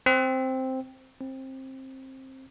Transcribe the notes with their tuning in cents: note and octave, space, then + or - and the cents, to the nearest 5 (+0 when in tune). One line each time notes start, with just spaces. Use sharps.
C4 +0
C4 +20